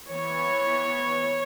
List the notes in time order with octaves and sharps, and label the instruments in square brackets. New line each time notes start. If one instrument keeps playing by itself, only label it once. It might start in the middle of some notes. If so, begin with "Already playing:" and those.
[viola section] E3 B3 C#5